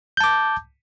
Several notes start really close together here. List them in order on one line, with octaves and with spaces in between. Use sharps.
G6 A5 D6